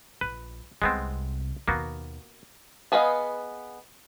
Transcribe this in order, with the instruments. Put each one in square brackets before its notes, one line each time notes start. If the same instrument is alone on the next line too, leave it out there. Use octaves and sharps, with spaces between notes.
[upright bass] A#1 [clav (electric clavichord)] B4
[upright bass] C2 C3 [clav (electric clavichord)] G#3 B3 C4
[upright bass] D#2 B2 [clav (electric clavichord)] A#3 B3 F#4
[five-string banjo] B3 G#4 B4 D#5 F5